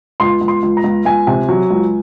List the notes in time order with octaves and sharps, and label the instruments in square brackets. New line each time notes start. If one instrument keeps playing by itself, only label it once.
[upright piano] C#2 C6
C#2
C6
C#2
A#5
C#2
C#2 G#5
C3
F#3
C#2